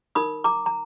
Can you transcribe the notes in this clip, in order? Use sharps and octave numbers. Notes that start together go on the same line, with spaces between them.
D#4 A#4 B5 D#6
A#5 D6
A#5